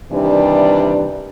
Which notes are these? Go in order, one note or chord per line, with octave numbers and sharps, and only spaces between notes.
C3 D#3 E3 G3 D4